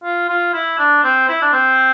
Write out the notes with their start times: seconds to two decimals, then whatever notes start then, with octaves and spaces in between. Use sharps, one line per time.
0.04 F4
0.29 F4
0.54 E4
0.79 D4
1.04 C4
1.29 E4
1.42 D4
1.53 C4